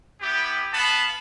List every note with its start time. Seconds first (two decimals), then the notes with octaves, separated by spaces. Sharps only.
0.21 B3 E4 G4
0.72 B3 F5 A5 B5